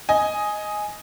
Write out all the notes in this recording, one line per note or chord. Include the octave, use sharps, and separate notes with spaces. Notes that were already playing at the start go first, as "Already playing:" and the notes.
D#5 G#5